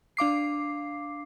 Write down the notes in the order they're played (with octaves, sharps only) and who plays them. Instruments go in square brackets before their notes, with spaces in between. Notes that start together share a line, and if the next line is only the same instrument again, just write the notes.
[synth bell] D4 F5 D6 C7